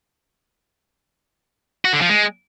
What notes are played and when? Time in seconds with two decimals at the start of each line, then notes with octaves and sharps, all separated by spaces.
1.85 F#4
1.93 D3
2.01 F3
2.09 G#3